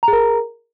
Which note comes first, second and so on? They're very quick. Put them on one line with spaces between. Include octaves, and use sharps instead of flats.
A#5 G#4 A#4